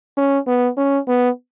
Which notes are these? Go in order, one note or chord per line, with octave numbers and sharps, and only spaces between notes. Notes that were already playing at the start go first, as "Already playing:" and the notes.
C#4
B3
C#4
B3